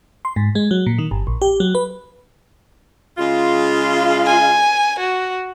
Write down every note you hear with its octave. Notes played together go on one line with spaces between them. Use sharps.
C6
G#2
G#3
F#3
A#2
D#3
G1
A#1
G4
F#3
B4
C#3 G#3 F4
G#5
F#4